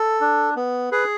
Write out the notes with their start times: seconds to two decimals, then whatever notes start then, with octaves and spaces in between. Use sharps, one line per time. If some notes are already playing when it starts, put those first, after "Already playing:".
Already playing: A4
0.21 D4
0.56 B3
0.92 G#4 B4